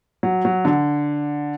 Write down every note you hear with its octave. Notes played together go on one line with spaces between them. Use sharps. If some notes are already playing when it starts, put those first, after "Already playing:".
F#3
F#3
D3